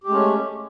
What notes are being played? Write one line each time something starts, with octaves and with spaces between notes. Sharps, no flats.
G#3 A3 C#4 G4